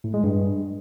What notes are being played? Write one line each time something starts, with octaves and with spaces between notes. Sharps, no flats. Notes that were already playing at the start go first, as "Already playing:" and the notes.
A2
G#3
G2